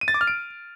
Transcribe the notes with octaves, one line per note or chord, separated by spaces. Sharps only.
D#7
A6
D6
F6
D7